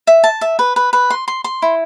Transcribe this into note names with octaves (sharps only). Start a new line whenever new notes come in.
E5
A5
E5
B4
B4
B4
C6
C6
C6
E4